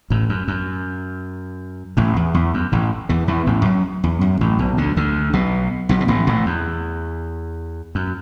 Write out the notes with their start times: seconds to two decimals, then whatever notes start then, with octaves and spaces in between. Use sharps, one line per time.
0.10 A1 A2
0.29 F#2
0.48 F#2
1.97 A1 A2
2.16 E2
2.34 E2
2.54 F#2
2.72 A1 A2
3.09 E2 E3
3.28 E2 E3
3.47 A1 A2
3.65 F#2
4.04 E2
4.21 F#2
4.41 A1 A2
4.59 B1 B2
4.77 D2 D3
4.97 D2 D3
5.33 B1 B2
5.89 B1 B2
6.00 B2
6.08 A1 A2
6.27 A1 A2
6.46 E2
7.95 F#2